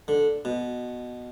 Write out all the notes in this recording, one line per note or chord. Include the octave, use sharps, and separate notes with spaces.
D3
B2